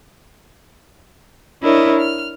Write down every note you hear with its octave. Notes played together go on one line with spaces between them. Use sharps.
D4 E4 A#4 C#5 D#5
F6